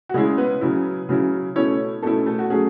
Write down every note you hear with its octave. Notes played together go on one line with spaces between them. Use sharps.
F#4
C#3 G#3 C#4 E4 G#4
B3 B4
C#3 F#3 C#4 E4
C#3 F#3 C#4 E4
B2 A3 C#4 E4 C#5
B2 A3 C#4 E4 A4
A3 A4
F#4
F#3 A3 C#4 G#4